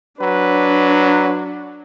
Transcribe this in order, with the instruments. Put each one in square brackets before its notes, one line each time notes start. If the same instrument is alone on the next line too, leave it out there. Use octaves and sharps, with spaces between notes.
[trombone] F#3 [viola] D4 [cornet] B4